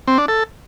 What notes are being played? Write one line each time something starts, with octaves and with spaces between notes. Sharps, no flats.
C4
D4
A4